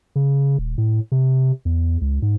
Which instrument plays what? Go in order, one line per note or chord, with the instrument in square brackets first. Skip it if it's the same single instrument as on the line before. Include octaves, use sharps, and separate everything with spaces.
[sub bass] C#3
D#1
A2
C3
E2
C#2
G#2